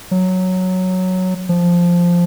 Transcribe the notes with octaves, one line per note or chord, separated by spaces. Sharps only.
F#3
F3